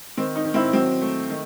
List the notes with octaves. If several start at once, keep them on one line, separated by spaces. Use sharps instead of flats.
D#3 C4
D#4
D#3
C4 E4
F#3 C4
A3
D#3